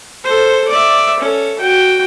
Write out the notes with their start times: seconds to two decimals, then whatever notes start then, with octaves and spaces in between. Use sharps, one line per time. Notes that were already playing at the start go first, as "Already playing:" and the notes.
0.24 A4 C5
0.68 D5 E5
1.20 C#4 A4
1.59 F#4 G5